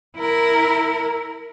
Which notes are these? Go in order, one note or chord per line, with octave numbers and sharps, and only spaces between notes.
E4 A#4